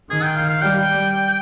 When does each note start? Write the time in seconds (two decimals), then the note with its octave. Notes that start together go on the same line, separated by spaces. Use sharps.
0.10 D#3 G#4
0.23 G5
0.36 F5
0.49 F5
0.62 G3 G5